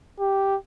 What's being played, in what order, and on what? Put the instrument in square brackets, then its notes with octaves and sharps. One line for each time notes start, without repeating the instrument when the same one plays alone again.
[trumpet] G4